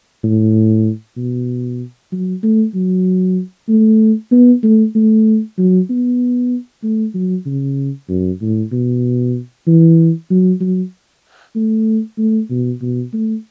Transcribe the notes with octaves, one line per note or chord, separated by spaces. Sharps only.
A2
B2
F#3
A3
F#3
A3
B3
A3
A3
F#3
B3
A3
F#3
C#3
F#2
A2
B2
E3
F#3
F#3
A3
A3
B2
B2
A3